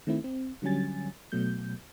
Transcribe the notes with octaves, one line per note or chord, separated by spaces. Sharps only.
D#3 A3 C4 E4
C4
D3 F#3 G3 C#4 G#5 A6
B2 F#3 A3 G6